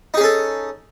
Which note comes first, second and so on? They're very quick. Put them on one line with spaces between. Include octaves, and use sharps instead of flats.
D#4 G#4 C#4 A4